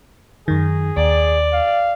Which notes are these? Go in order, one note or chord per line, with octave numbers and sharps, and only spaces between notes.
F#2 D#3 G#4
D#2 D5
F5